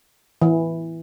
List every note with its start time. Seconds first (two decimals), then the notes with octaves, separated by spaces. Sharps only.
0.42 E3